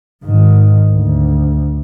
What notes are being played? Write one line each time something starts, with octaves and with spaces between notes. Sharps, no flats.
G#2 D#3
D2